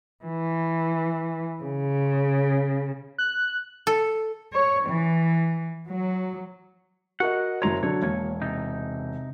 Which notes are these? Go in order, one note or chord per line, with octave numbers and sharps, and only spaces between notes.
E3
C#3
F#6
A4
C#5
E3
F#3
F#4 A#4 D#5 F#5
F#1 F#3 C#5 A#5 C6
D3 F#3 C#5
E1 A#3 C#5
C3 D#4